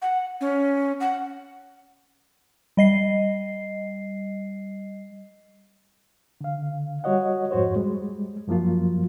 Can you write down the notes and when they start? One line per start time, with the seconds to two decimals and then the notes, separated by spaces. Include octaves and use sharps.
0.02 F#5
0.41 C#4
1.00 F#5
2.77 G3 D#5 C7
6.41 D3 F5
7.04 G3 F#4 C#5 D#5 F#5
7.51 F2 G#2 F#4 C5 C#5
7.76 G3 G#3
8.48 F#2 F3 F#3 A#3 F4